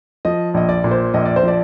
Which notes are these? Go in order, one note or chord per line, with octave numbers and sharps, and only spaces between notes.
F3 D#5
A#1 D#5
D5
A#2
C5
A#1 D#5
D5
C5
F3 D5